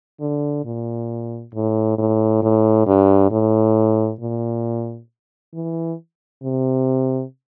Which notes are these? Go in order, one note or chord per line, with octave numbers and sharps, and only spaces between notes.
D3
A#2
A2
A2
A2
G2
A2
A#2
E3
C3